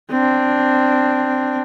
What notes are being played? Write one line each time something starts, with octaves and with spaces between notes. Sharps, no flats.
C4 D4